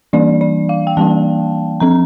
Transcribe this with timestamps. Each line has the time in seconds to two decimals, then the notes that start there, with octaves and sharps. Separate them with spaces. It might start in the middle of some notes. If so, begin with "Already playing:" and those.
0.13 E3 G3 A#3 D4 D5
0.41 D5
0.69 F5
0.87 G5
0.97 E3 G3 A#3 D4 A5
1.80 F3 C4 A#5